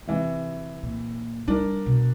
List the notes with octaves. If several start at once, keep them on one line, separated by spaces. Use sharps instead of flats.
C3 E3
A#2
G3 D4 A#4
B2